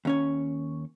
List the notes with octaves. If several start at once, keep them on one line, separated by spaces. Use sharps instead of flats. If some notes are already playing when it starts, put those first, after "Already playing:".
D#2 C#4 C#5